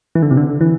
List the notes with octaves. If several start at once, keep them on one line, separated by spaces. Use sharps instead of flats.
E3
D3
C3
D3
E3